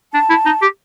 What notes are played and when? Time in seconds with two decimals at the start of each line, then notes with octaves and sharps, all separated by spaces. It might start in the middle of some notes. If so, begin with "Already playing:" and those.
0.13 D4 A5
0.30 E4
0.46 D#4
0.62 G4